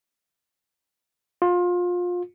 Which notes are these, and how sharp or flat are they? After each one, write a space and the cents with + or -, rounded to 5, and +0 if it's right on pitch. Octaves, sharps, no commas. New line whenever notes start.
F4 +25